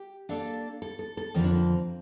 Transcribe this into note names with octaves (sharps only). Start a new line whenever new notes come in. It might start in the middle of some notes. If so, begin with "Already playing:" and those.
Already playing: G4
A#3 D4 A4 D5 F5
A4
A4
A4
F2 D3 F3 A#3 C4
D4
C4